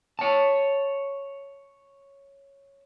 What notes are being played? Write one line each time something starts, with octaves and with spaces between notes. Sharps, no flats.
C#5 A5